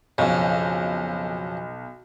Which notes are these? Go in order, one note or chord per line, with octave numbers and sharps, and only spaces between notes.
B1 F2 C#3